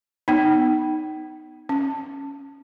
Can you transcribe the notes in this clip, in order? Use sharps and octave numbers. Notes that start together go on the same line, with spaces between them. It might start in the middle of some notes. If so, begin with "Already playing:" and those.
B3 D#4
C#4